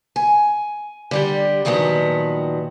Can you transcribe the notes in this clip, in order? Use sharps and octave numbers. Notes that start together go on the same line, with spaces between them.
G#5
D3 G3 G4
A#2 D#3 F3 F#3 B3